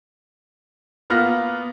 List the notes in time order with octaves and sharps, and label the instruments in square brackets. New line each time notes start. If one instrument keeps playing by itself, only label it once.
[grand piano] A#3 B3 F4 F6 F#6 A#6